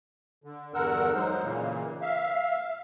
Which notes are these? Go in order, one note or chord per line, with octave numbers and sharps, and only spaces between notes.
D3
E2 G2 D3 A#4 F#5 E6
F#3 G#3 D#4 C5
A#2 C#3 E3 A#3
E5 F5